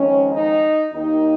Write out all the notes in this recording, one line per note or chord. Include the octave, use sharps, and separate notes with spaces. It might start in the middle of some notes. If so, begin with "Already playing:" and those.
Already playing: F2 D#3 G#3 C#4
D#4
D#2 D#3 A#3 D#4